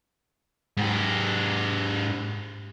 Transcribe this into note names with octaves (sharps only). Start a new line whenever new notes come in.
G#2 G4